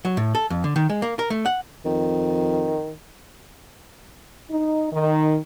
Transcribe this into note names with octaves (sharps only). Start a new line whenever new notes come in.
F#3
A2
A4
F2
D3
D#3
G#3
A#3
A#4
A3
F#5
F2 D#3
D#4
D#3